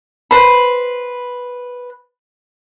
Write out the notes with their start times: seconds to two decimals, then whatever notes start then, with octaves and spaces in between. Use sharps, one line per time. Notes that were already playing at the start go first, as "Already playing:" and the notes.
0.31 B4 C5 B5